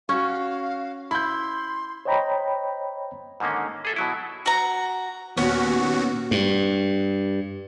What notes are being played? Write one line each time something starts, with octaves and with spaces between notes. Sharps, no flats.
C#4 F#4 F5 C#6
E4 B5 C6 G6
C5 C#5 D#5 G5 A#5 B5
G#2 D3 D#3 A#3 C#4
G#4 A4 E5
B2 F#3 E4
F#4 A#5
D#2 A#2 B3 C#4 F#4
G2